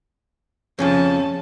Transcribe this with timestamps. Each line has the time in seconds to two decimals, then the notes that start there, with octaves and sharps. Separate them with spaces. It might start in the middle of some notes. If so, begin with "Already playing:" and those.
0.79 F2 C#3 F3 C#4 A5